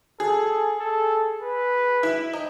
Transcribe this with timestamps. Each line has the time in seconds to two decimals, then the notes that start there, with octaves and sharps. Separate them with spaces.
0.19 G#4 A4
0.80 A4
1.42 B4
2.03 E4
2.33 D#4